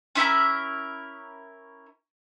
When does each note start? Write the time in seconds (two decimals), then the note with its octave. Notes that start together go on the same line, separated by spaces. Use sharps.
0.15 C#4 E4 A4 A#4